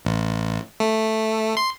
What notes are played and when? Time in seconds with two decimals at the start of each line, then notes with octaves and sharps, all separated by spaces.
0.05 A1
0.80 A3
1.57 C6